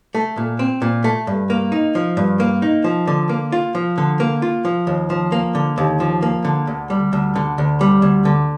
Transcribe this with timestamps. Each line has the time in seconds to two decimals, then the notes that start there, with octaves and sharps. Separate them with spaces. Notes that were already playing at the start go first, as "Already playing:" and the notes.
0.15 A3
0.37 A#2
0.59 C4
0.82 A#2
1.04 A3
1.27 G2
1.50 A#3
1.72 D#4
1.95 F3
2.17 G2
2.40 A#3
2.62 D#4
2.84 F3
3.07 D3
3.29 A#3
3.52 F4
3.75 F3
3.98 D3
4.20 A#3
4.42 F4
4.65 F3
4.87 D#2
5.10 F3
5.32 A#3
5.55 D3
5.78 D#2
6.00 F3
6.22 A#3
6.45 D3
6.67 D2
6.90 G3
7.13 D2
7.36 D3
7.58 D2
7.81 G3
8.02 D2
8.25 D3